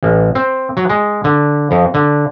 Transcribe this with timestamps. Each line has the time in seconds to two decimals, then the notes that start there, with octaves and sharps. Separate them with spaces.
0.03 A1
0.35 C4
0.77 F#3
0.89 G#3
1.24 D3
1.71 F2
1.94 D3